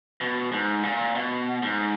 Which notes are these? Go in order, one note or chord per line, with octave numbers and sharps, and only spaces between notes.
B2
G#2
A#2
B2
G#2